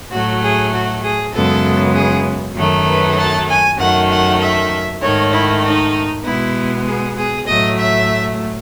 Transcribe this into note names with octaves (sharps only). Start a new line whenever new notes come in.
A2 F#3 A3 F#4
G#4
F#4
G#4
F#2 C#3 G#3 B3 A4
G#4
F#2 D#3 F#3 A3
B4
A5
G#5
F#2 D#3 A3 F#5
F#5
E5
G#2 D#3 A3 C#5
E4
D#4
B2 G#3 B3 E4
G#4
G#4
A2 F#3 A3 D#5
E5